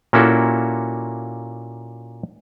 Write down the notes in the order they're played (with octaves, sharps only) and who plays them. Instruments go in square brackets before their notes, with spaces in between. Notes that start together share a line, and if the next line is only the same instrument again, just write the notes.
[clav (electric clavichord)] A#2 A#3 C#4 E4 F#4 A4